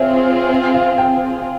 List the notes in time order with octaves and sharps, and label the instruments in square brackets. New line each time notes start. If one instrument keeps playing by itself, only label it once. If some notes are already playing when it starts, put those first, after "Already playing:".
Already playing: [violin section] C4 F4 G#4 [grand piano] C#5 E5
[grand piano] F5
G5